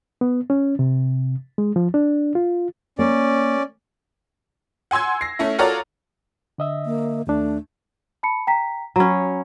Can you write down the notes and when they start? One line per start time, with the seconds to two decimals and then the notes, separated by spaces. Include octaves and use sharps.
0.21 B3
0.50 C#4
0.79 C3
1.58 G#3
1.76 F3
1.94 D4
2.35 F4
2.99 A#3 C#4 D5
4.91 F#5 G#5 C6 E6 G#6
5.21 A#6 C7
5.39 A3 C#4 E4
5.59 F4 F#4 A4 A#4 C#5 D5
6.58 D3 D#5 E5
6.86 A#3
7.27 D#2 A3 D4
8.23 A5 B5 C#7
8.47 G5 A#5 B6
8.96 F#3 C#4 A#5 B5